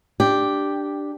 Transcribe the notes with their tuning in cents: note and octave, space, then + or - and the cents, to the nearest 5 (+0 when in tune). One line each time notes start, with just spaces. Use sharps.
D4 +5 G4 +0